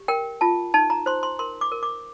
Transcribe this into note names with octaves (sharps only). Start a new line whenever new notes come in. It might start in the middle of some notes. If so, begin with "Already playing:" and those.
Already playing: G4
A#4 G5
F4 A5
D#4 A5
A#5
C5 C6
C6
A#4 C6
D6
A#4
D6